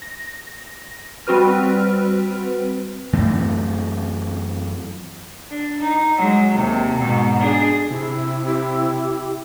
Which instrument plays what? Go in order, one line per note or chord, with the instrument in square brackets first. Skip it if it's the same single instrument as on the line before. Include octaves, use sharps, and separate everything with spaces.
[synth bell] A#6
G3 C4 F#4 B4 F6
[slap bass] F#2 E3 A3 C4
[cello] D4
D#4
F#3 G#3
D#2 C3
G#2 B2
D4 G#4
[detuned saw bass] C3 [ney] E4
[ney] E4 [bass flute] G4